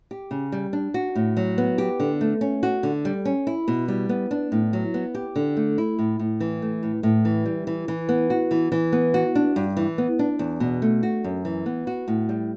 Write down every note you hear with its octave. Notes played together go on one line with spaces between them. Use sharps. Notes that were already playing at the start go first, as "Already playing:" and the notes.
G4
C#3
G3
D4
F#4
A2
F#3
B3
G4
D3
A3
C#4
F#4
D3
G3
C#4
E4
B2
G3
B3
D4
A2
F#3
B3
G4
D3
A3
E4
A2
A2
E3
A3
A2
A2
E3
G3
E3
E3
B3
F#4
E3
E3
B3
F#4
D4
G2
E3
B3
D4
E2
B2
A3
F#4
F#2
E3
B3
F#4
A2
G3